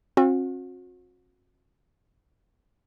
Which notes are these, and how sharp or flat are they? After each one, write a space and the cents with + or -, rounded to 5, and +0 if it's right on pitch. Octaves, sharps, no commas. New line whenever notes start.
C4 +40 F#4 -40